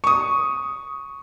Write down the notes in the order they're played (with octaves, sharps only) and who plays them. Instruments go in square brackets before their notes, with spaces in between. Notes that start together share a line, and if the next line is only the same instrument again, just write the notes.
[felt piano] C#6 D#6